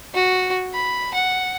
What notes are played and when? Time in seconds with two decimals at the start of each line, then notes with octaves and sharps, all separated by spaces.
0.14 F#4
0.74 B5
1.14 F#5